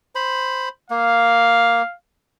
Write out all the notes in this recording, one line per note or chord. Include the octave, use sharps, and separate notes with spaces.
C5 B5
A#3 F5